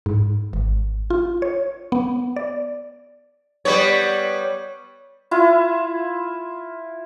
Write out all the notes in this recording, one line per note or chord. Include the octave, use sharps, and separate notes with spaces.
G#2
G#1
F4
C#5
B3
D5
G3 B3 C#5
E4 F4